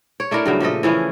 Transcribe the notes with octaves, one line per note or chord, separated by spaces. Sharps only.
C#5
A3 D4 E4 A#4
G2 C#3 F#3
A#2 F3 A3 D#5
E3 F3 C#4 E4